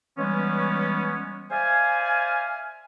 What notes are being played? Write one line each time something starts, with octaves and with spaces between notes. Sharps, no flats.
E3 G3 G#3 B3 C#4
C5 D5 E5 F5 G#5